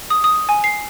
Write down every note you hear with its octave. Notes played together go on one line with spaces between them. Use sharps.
D#6
D#6
G#5
C7